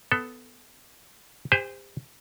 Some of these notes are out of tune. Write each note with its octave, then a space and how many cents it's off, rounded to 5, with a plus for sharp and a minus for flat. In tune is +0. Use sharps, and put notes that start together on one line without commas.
B3 +15 A4 +0
G4 +40 C5 -15 G#5 +0